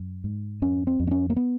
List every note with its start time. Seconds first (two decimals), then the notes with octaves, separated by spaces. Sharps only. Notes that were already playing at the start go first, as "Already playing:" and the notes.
Already playing: F#2
0.24 G#2
0.62 F2 C#4
0.87 C4
1.00 F2
1.07 C4
1.11 C#4
1.30 A#3
1.36 B3